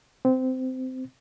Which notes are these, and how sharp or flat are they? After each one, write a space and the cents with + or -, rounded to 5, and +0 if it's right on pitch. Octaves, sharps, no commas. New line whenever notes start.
C4 -20